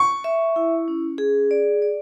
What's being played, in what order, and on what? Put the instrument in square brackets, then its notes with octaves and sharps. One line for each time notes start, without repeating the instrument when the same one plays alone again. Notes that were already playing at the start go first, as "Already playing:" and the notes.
Already playing: [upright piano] C#6
[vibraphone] E5
E4
C#4
G#4
D5
D5